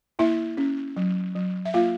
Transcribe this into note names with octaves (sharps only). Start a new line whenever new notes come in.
A#3 E4 E5
C#4
F#3
F#3
E5
A#3 F4 F5